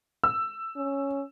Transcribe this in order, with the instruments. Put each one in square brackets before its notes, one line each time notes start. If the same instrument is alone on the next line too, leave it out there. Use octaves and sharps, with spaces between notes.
[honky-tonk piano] E6
[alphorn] C#4